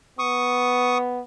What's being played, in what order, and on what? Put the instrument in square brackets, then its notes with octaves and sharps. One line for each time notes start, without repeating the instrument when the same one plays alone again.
[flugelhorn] B3 [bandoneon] C#6 D#6